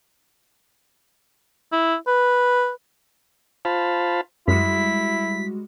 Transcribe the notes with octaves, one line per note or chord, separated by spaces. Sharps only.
E4
B4
F4 C5 F5 A5 B5
F#2 G3 G#3 E4 F#4 B6